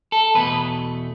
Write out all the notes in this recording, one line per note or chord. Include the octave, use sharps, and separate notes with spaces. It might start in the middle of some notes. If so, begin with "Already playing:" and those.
A4
E2 B2 A3 B4